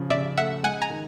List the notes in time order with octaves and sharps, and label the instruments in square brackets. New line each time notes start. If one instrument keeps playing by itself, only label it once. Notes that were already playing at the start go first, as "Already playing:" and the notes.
Already playing: [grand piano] C#3 F3
[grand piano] C#3 [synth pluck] D5 E5
[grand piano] A3 [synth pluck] E5 F#5
[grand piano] G#3 [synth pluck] F#5 G#5
[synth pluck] G#5 A#5
[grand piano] D#3